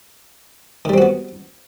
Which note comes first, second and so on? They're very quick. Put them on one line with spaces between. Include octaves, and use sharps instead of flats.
D#3 G3 C4 F#4 B3